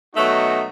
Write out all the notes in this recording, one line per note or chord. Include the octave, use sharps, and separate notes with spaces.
B2 F#3 A3 D#4 F#4